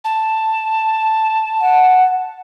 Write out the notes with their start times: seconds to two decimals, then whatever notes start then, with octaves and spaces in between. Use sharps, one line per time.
0.05 A5
1.61 F#5